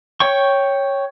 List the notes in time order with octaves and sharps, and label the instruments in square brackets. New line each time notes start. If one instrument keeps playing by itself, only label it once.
[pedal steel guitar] C#5 G5 C#6